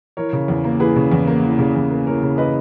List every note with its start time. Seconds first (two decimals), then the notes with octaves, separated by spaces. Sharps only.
0.17 E3 A#4 C#5
0.33 C#3
0.48 E2
0.64 A#3
0.80 E3 G#4 B4
0.96 C#3
1.12 E2
1.27 A#3
1.43 E3
1.59 C#3
1.75 E2
1.90 A#3
2.07 E3 A#4 C#5
2.22 C#3
2.38 B4 D#5